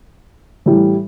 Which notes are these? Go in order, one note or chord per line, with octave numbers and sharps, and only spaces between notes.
A2 E3 G3